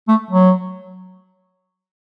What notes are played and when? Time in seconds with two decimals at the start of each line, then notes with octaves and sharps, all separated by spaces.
0.08 A3
0.31 F#3